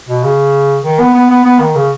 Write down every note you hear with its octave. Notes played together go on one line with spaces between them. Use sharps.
B2
C#3
D#3
B3
B3
B3
B3
D#3
C#3